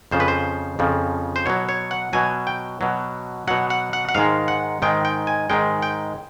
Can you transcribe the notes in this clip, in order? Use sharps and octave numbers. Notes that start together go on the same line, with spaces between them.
F2 C#3 F3 C5
B4
C5
F2 C#3 F3
C5
B2 F#3 C#5
C#5
F#5
B2 F#3 G#5
G5
B2 F#3
B2 F#3 F#5
F#5
F#5
F#5
G#2 D#3 G#3 F5
F#5
G#2 D#3 G#3 G5
G5
G#5
G#2 D#3 G#3 G5
G5